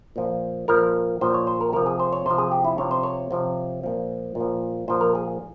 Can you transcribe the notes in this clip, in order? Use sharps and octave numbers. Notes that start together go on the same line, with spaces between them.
A#2 F3
A#2 F3 A#4
A#2 F3 C5
C#5
C5
A#4
C3 F3 A#4
G#4
C5
C#5
C3 F3 C5
G#4
G4
E4
C3 F3 C#5
C5
C#5
C3 F3
A#2 F3
A#2
F3
A#2 F3 C5
A#4
G#4